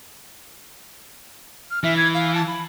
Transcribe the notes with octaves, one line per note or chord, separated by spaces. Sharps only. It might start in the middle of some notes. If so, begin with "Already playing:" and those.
F6
E3 E5
G#6
F5
A5
B5